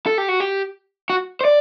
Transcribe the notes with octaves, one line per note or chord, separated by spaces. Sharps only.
A4
G4
F#4
G4
F#4
C5
D5